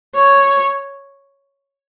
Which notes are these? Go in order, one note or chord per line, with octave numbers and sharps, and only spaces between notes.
C#5